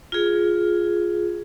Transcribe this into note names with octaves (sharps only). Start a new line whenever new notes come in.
F4 G#4